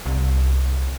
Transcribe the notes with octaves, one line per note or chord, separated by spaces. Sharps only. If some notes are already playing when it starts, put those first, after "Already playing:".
C2